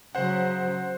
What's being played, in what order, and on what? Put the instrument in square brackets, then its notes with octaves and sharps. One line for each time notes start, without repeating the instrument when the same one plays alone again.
[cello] C#3 F#3 [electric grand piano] C5 F#5